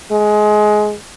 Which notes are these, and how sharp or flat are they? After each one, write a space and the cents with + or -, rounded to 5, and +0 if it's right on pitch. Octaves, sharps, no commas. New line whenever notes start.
G#3 +20